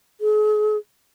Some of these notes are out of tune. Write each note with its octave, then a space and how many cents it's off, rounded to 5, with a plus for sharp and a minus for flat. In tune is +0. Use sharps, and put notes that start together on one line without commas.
G#4 +40